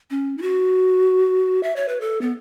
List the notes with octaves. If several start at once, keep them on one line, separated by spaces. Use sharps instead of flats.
C#4
E4
F#4
E5
C#5
B4
A4
B3